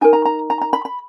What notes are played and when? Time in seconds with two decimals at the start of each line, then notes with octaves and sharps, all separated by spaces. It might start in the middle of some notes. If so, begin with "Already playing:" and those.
0.01 D#4 A#4 G#5
0.13 A#5
0.25 A#5
0.50 A#5
0.61 A#5
0.73 B5
0.85 B5